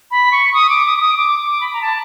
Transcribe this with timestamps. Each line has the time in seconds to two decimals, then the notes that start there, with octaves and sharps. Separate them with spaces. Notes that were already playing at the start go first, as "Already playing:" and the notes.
0.11 B5
0.32 C#6
0.54 D#6
0.70 D6
0.85 D#6
0.97 D6
1.01 D#6
1.17 D6
1.39 D6
1.61 B5
1.73 A#5
1.82 A5